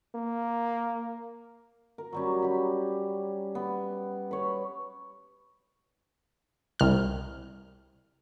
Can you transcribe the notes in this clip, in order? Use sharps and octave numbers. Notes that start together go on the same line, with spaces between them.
A#3
A#4
F#3 G3 C#4
G4 B5
B3
B4 C#5
C2 F6